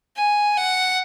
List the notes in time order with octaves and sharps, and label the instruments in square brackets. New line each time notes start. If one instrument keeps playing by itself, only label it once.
[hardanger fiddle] G#5
F#5